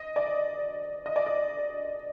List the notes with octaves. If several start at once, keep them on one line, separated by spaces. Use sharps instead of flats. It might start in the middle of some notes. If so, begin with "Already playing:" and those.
Already playing: D#5
D5
D#5
D5
D#5